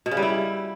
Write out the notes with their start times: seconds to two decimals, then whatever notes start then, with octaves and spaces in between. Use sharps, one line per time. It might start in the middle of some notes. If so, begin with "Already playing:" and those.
0.06 B2
0.11 C#3
0.17 G3
0.23 E4